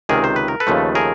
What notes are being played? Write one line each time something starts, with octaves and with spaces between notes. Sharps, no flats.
C#2 C3 D#3 G#4 A#4
C5
B4
A#4
A4 B4
D#2 C#3 F3 A3
G#4 A#4